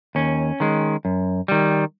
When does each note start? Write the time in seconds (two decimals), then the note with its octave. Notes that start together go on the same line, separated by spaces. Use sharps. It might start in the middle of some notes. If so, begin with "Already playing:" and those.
0.15 D#2 C#4
0.60 D#3 G#3
1.05 F#2
1.48 D#3 G3